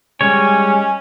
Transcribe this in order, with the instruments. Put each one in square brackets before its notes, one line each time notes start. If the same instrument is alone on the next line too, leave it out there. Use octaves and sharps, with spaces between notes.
[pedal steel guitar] G3 G#3 C#5 [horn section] C#4